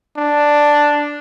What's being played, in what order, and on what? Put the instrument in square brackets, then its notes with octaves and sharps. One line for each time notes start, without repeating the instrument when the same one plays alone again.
[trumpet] D4